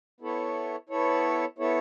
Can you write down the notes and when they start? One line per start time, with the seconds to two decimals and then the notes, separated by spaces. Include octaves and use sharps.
0.21 B3 E4 A4 C#5
0.89 B3 E4 A4 C#5
1.59 B3 E4 A4 C#5